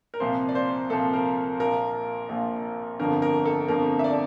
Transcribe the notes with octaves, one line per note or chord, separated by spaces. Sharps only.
A#4
C2 A#2 F3 C4 C5
D5
C5
C2 A#2 F3 C4 A4
A#4
A#1 A#2 F3 A#4
A#1 A#2 F3
G1 F2 D3 F3 A#4
A#4
A4
G1 F2 D3 F3 A#4
E5
D5